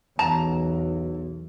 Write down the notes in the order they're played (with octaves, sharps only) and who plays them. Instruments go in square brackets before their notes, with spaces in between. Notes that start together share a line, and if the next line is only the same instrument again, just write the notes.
[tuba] B1 [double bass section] E2 [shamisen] A5 [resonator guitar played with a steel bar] A#5